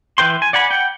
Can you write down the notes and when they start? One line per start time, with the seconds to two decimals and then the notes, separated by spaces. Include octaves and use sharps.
0.18 E3 B4 G5 C6
0.42 G#5
0.53 D5 F#5 G#5 B5
0.70 F#5 G5